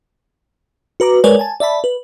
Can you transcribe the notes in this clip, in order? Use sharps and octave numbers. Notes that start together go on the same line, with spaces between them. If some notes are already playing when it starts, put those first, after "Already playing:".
F#4 B4 A#5 D6
G#3 A#4 B4 C#5 D5 G#5
G#5 A5
D5 E5 A5 B5
B4